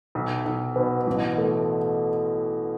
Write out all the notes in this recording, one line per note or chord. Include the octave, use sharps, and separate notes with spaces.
B1
B1
B2
A1
A3